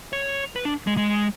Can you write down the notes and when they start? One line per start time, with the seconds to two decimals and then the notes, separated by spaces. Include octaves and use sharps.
0.13 C#5
0.56 B4
0.65 D4
0.87 G#3
0.97 G#3